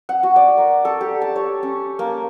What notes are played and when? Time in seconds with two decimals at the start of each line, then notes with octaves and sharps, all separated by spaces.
0.09 F#5
0.23 F#4
0.36 D5
0.57 A#4
0.85 A4
1.01 G4
1.22 A5
1.36 C#5
1.63 C#4
1.99 A#3